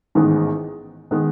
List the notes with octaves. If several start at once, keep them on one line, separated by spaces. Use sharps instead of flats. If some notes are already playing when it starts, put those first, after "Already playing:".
A1 G#2 D#3 G#3 B3
D#3 G#3 B3